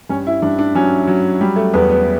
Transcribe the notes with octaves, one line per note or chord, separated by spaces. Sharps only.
G2 C#4
E4
G2 D4
D4
F#3 C#4
F#3
G3
A3
E2 B3
B3